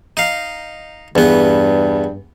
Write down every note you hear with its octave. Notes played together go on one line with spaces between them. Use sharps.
D#4 F5
E2 G2 B3